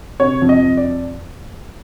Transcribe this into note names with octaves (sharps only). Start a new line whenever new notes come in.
C3 C#5
F2
D#5
F2
D5